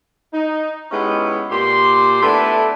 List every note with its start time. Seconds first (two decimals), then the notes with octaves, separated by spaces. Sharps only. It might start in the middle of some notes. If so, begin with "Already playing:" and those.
0.33 D#4
0.91 G#3 B3 C#4 D#4 E4 G4
1.50 A#2 G4 D5 C6
2.22 A3 B3 D4 E4 A4